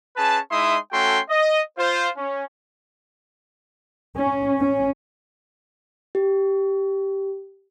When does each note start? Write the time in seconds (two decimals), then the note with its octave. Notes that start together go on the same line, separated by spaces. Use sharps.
0.17 C#4 G#4 B4 A5
0.51 G#3 D#4 E4 E5 C6 D#6
0.93 A3 C#4 F#4 A4 G5 C6
1.30 D#5
1.79 F4 C5
2.17 C#4
4.17 C#4
4.60 C#4
6.15 G4